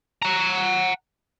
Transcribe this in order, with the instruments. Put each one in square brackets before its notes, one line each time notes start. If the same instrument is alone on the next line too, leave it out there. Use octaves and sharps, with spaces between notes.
[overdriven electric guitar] F#5 A#5